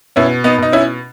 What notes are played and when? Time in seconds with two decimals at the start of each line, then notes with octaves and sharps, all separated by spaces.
0.16 B2 C#4 E4
0.44 B3 D#4
0.58 B2 D#4
0.72 C#4 E4